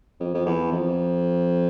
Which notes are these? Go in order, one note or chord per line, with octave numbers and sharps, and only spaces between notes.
F2
F2
E2
F2